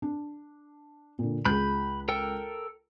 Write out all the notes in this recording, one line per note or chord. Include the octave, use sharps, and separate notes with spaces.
D4
A#2 D3
C#2 G#4 B5 F#6 G6
A4 A#4 G5